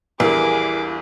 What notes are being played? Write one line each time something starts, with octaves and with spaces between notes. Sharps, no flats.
A#1 E2 G3 E4 G#4 A#4 B4 D6